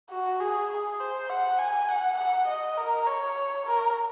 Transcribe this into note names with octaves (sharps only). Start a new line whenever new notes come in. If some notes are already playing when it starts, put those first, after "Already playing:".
F#4
G#4
G#4
C5
F#5
G#5
F#5
F#5
D#5
A#4
C#5
A#4